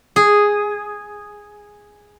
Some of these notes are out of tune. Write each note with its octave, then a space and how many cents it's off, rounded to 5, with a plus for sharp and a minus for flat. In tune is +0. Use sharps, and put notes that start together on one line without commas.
G#4 -5